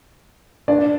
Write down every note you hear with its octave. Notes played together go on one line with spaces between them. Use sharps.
D4 D5